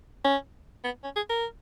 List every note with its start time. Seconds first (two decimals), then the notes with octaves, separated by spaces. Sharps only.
0.25 C#4
0.84 B3
1.04 C#4
1.16 G#4
1.30 A#4